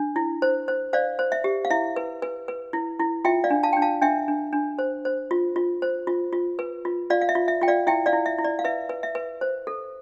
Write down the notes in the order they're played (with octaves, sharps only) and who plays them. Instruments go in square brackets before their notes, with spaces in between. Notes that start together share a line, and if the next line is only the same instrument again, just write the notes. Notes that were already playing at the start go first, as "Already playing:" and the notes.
Already playing: [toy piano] D4
E4
C5
C5
C5 D5 F5
C5
E5
G4
F5
E4 E5
B4
B4
B4
E4
E4
F4 E5 G5
D5 F5
D4
F5 A5
D4 G5
F5 A5
D4 E5 G5
D4
D4
C5
C5
F4
F4
C5
F4
F4
B4
F4
F4 D5 F5
F5
E5
F4
E5
F4 G5
D5 F5
E4 E5 G5
D5 F5
E4
E5
E4
D5
F5
B4 E5
B4
E5
B4
C5
A4